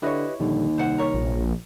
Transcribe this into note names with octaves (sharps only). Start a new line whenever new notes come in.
D3 E4 G4 B4 C#5 D#5
A#1 D#2 D3 G3
C2 C5 F#5
A#4 C#5
A#1